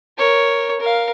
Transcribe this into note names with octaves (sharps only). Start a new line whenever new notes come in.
A#4 C#5
A#4 F5